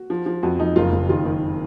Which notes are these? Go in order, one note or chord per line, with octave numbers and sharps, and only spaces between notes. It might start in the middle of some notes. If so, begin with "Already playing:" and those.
Already playing: F#4
F3
F3
F2 F#4
F2 D#4
F#1 F4
F#1
D#3 F4
D#3